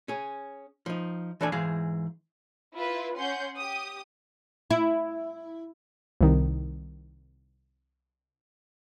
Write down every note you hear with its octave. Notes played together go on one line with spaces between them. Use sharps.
C#4 G#4
F3 D#4
E3 D4 A4 D5 G#5
G#2 E3 G#4 F5
E4 F4 B4
C#4 F#5 C6 G6
G4 D#6
E4
C2 D#3